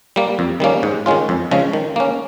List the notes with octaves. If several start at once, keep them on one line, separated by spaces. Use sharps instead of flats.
G3 A#3
F2
D#3 G3 A#3 C#4
G#2
D#3 G#3 C#4 F4
F2
C#3 F3 G#3 C#4
D#3
A#3 C#4